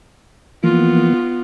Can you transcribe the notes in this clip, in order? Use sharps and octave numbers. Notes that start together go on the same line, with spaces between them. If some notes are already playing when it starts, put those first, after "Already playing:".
E3 F3 A#3 B3 F4